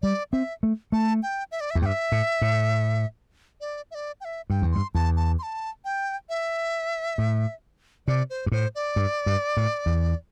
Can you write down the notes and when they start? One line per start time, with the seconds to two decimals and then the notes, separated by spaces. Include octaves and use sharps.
0.02 G3 D5
0.32 C4 E5
0.63 A3
0.92 A3 A5
1.23 G5
1.52 E5
1.60 D5
1.71 E5
1.75 E2
1.82 G2 E5 G5
2.12 A2
2.42 A2
3.61 D5
3.91 E5
3.95 D5
4.21 G5
4.25 E5
4.50 G2 G5
4.62 E2
4.72 G2 C6
4.95 E2 A5
5.16 A5
5.39 C6
5.43 A5
5.85 G5
6.29 E5
7.18 A2
8.08 C3 D5
8.30 C5
8.46 G2
8.52 A2 C5
8.75 D5
8.96 G2
9.26 G2
9.57 A2
9.86 E2